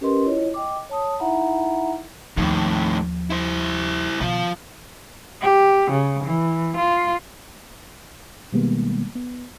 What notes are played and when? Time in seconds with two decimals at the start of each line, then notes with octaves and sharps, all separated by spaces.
0.01 C#4 G4 A#4 B4 D#5 C6
0.26 E4 F4 C#5 D#5
0.54 D#5 G5 D6
0.90 C#5 A5 D#6
1.19 D#4 E4 E5 F#5 A#5 B5
2.37 D#2 A2 D#3 F3
3.30 E4 C5
4.21 B2 D#3 F3
5.42 G4
5.91 C#3
6.25 E3
6.77 F4
8.53 B2 D#3 G3 G#3 A#3 B3
9.15 B3